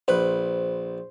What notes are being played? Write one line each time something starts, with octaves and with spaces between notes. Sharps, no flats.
A#1 B4 C5